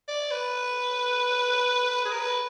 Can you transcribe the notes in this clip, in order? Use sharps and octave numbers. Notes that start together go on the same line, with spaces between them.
D5
B4
G#4
A#4
B4